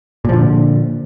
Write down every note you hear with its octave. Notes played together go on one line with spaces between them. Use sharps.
A#2 D3 F3